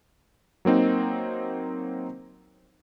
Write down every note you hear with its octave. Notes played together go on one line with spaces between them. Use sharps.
F#3 A#3 C4 D#4